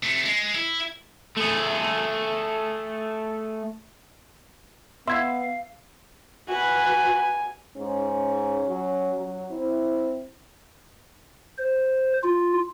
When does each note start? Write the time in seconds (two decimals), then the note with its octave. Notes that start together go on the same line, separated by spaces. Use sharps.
0.03 C3 A3
0.25 G#3
0.55 E4
1.37 A3 G#4
5.08 B3 E5 F5 C6 G#6
6.48 F#4 B4 G#5
7.77 G#2 C#4
8.68 F#3
9.17 F#3
9.51 C4 E4
11.58 C5
12.24 F4